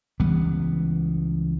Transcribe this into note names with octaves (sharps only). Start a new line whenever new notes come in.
C#2 E3 G3 B3